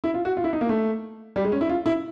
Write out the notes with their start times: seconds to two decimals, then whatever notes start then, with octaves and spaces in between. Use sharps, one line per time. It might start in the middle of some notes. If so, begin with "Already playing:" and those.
0.04 E4
0.14 F4
0.25 F#4
0.37 F4
0.44 E4
0.53 D#4
0.61 A#3
0.69 A3
1.36 G3
1.44 G#3
1.52 C#4
1.61 E4
1.69 F4
1.86 E4